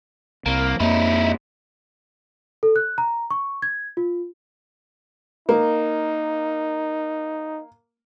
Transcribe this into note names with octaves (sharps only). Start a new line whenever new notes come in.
C2 A#3
F2 A#3 D#4 E4
A4
F#6
A#5
C#6
G#6
F4
A#3 D#4